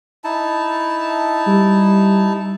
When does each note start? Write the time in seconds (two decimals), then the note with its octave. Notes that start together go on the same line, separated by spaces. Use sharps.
0.24 D#4 E4 A5
1.47 G3